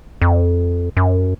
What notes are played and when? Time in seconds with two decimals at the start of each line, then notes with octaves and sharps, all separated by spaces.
0.22 F2
0.97 F#2